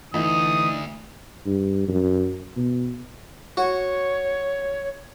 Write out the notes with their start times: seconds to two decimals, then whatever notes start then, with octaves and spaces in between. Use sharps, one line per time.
0.14 D2 E3 A3 D#4 D#6
1.46 G2
1.88 F#2
2.57 B2
3.57 F#4 C#5